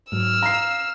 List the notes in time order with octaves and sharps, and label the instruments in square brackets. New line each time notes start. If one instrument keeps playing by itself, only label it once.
[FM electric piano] G#2 F#3 [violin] E6 F6
[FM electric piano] F5 D#6 [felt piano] A#5 C7